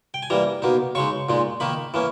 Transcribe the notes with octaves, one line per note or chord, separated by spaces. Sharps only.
G5
G#5
E3 G3 A#3 A#5
B2 A#3 D#4
C#3 G#3 D#4 C#6
A#2 G#3 D#4
D#3 A#3 D#4 B5
E3 A#3 C#4